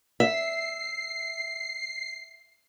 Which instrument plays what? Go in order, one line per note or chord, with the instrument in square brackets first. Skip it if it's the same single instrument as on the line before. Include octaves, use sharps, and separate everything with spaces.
[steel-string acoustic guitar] E5 [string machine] C7